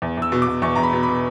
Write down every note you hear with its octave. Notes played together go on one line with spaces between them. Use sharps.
E2
E2 E6
B2
D6
B2
E2 C#6
E2 A#5
B5
B2
B5
B2